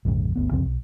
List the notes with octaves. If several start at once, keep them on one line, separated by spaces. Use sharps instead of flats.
A#1 F2 G#2 C#3
G1 D2 B3
C2 F2 C#3 C4
B1